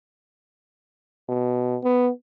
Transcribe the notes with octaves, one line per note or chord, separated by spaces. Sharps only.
B2
B3